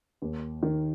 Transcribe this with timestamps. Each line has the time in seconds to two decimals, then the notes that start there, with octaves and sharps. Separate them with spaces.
0.22 D#2
0.63 D#3